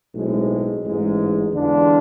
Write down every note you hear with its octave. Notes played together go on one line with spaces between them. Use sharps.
B1 A2 G#3 C4
A1 G#2 G#3
E2 D3 G#3 D4 F4